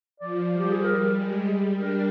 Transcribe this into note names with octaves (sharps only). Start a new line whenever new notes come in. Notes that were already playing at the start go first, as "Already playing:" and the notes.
F3 D5
G3
G4
G#4
A#4
G#3
G3 G#4
D4 A#4